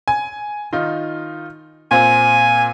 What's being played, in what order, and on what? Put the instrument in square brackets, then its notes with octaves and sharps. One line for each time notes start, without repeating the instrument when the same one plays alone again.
[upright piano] G#5
D#3 D#4 F4
[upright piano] A#2 C4 [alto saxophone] G#5